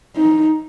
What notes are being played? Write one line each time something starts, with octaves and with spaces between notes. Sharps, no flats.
D#4